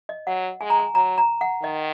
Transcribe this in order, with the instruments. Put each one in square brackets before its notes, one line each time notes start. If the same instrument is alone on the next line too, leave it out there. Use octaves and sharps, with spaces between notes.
[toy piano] D#5
[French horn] F#3 [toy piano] F#5
[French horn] G#3 [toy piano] G#5
[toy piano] A#5
G#5
[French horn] F#3 [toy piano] A#5
[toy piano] A#5
F#5
[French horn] D#3 [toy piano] D#5